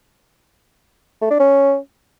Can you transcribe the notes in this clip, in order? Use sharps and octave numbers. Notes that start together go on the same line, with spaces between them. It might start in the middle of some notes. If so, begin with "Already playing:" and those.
A3
D4
C#4